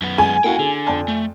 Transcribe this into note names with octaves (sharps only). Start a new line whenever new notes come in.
F#2 B3
G#3 G#5
A#3 E4 F#4 F5 G5
D3 G#4
F2 D5 A5
A3